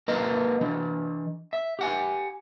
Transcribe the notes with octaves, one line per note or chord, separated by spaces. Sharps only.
A#3 A#4 B4 D#5 F5 A#5
E3 D4
E5
G4 F#5 G#5